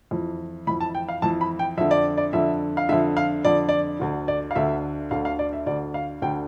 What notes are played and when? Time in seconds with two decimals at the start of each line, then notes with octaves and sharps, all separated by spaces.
0.11 F2 E3
0.67 F2 E3 B5
0.80 A5
0.95 G5
1.09 F5
1.22 F2 E3 A5
1.41 B5
1.59 G5
1.78 F2 D3 E5
1.91 D5
2.18 D5
2.33 F2 D3 E5
2.77 F5
2.89 F2 D3 E5
3.17 F5
3.45 F2 D3 D5
3.69 D5
4.00 D2 D3
4.28 D5
4.51 F5
4.56 D2 D3 E5
5.11 D2 D3 F5
5.25 F5
5.39 D5
5.53 E5
5.66 D2 D3 D5
5.94 F5
6.22 D2 D3 G5